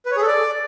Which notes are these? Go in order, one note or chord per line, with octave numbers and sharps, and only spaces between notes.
B4
C#5
G#4
A4
D5